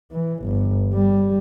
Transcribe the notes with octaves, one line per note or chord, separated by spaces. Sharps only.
E3
G1
G3